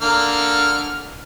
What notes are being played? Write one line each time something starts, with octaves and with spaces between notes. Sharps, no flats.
D3 A#3 F6